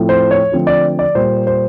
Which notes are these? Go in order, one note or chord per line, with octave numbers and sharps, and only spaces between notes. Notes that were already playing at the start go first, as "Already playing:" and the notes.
Already playing: A2 F3 A3 C4
C5
C#5
D3 F3 A3 C4
D5
D5
A#2 G3 A#3 C5
C5